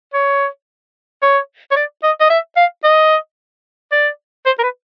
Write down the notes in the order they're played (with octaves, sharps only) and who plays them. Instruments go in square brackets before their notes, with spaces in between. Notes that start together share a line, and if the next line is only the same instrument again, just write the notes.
[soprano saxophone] C#5
C#5
C#5
D5
D#5
D#5
E5
F5
D#5
D5
C5
A#4
B4